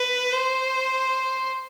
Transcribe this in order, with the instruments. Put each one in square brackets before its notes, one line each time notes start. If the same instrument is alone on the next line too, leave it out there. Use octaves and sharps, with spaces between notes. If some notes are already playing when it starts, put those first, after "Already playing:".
Already playing: [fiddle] B4
C5